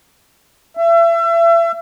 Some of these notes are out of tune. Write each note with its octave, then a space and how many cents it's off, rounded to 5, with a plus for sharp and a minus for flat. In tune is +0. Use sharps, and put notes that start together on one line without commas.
E5 +35